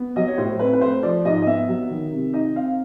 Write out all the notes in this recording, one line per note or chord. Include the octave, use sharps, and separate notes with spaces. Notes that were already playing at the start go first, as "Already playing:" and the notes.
Already playing: B3
F#3 D#5
C#5
A2 C5
C4 B4
B4
A3 C5
F3 D5
G#2 D#5
D#5
B3 E5
F#3
D#3
C3
D#4 D#5
C4 F5